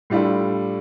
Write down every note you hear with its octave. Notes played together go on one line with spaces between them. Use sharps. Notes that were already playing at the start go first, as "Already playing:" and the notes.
A2 G3 D4 F4 A4